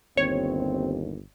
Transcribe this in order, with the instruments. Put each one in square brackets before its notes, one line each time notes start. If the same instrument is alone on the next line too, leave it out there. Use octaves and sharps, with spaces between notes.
[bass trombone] G1 [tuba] D#2 [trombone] C4 [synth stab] C#5